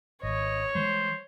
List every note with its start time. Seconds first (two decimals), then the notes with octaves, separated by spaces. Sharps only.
0.23 G#1 C#5 D#5
0.75 E3 G3 G#3 C5